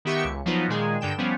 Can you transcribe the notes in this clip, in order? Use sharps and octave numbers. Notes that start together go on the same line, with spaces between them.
D#3 B3 G4 E5 C#6 C#7
C#2
F3 F#3 B3 D#4 F4
A#2 D#3 G#3 G#4
G2 D3 G5 E7
F3 G3 B3 C#4